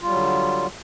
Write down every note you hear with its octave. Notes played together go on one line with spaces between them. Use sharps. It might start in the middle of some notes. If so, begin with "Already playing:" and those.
D3 F#3 G3 F4